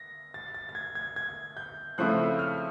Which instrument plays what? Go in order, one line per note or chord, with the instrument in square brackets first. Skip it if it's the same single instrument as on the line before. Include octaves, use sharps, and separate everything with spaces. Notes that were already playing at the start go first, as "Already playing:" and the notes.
Already playing: [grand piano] A#6
A6
A6
A6
G#6
G#6
G#6
G6
[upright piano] C#3 F3 A3 C4 E4 [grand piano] F#6
[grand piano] F6